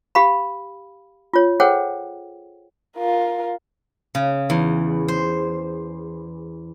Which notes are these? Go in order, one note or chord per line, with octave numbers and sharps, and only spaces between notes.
G4 F5 B5
F4 C#5
G#4 A4 C5 C#5 F#5 G5
F4 A#4
C#3
E2
C5